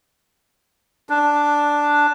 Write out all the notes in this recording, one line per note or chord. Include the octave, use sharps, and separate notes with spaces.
D4